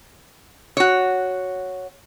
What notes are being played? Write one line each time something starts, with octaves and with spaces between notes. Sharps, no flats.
F#4 C#5